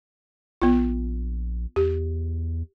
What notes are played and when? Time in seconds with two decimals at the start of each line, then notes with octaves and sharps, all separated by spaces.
0.62 A#1 B3 F4
1.76 E2 G4